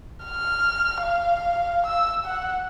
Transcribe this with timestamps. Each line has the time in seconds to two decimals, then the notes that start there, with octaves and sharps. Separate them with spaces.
0.25 F6
1.02 F5
1.86 E6
2.26 F#5